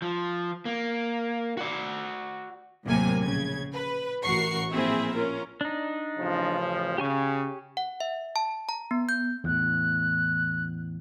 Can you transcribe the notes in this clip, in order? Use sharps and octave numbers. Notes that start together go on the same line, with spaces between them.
F3
A#3
F#4 D5
D#2 A2 C3 F#3 A#3 G#5
A#1 C#3 G#6
B4
A1 F#4 A#4 F#5 C#6 C7
A#1 A#3 C4 E4 G#4 E5
C#4 F4 A#4
D4 D#4
A1 C#3 F3
C#3 G4 G#5 C#6
F#5
E5
A5
A#5
B3
G6
E2 A2 F#6